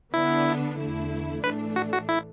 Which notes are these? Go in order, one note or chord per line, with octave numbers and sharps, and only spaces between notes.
D3 B3 D4 E4
E2 D3 A3 E4
A2 E3 A3 D4 B4
F#4
F#4
E4